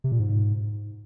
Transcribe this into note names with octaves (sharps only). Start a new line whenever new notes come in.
C3
A#2
G#2